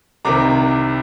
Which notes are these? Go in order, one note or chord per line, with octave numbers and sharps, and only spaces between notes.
C2 C3 D#3 A#5 D6